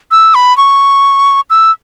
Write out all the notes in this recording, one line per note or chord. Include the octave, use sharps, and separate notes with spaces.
E6
B5
C#6
E6